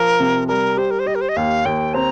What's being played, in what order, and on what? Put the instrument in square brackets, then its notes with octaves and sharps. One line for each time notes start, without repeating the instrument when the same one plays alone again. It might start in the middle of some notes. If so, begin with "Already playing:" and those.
Already playing: [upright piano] F3 [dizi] A#4
[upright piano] C3
[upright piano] G3 [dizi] A#4
[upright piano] G4 [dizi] C5
[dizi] A#4
C5
[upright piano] G4 [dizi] D#5
[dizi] A#4
C5
D#5
[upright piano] D#2 [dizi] F5
[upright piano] D#2 [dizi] G5
[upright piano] C4 [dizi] A#5